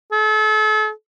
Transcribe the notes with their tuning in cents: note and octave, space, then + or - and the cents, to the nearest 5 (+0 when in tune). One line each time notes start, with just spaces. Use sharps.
A4 -40